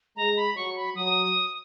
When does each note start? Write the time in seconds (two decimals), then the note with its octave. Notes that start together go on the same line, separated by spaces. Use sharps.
0.16 G#3 A#5
0.37 B5
0.56 F#3 C#6
0.76 B5
0.95 F#3 D#6